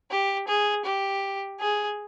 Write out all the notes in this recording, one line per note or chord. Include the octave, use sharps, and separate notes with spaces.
G4
G#4
G4
G#4